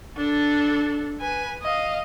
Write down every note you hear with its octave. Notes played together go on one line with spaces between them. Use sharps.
D4 A4
B4 G#5
D#5 F5